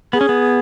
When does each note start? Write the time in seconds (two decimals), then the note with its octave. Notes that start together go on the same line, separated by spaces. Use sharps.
0.13 B3 G#4
0.21 C#4
0.29 B3